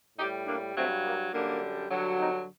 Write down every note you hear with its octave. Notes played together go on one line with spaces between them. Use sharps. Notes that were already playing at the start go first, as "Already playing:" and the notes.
A2 G3 D#4 G4
A#3 D4
G2 F#3 A3 C4
A#3
F#2 D3 G3 A#3 D4
G2 D3 F#3
C4 D#4